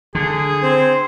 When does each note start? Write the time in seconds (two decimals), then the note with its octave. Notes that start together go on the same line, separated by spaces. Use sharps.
0.15 D3 G#4
0.62 C4 C5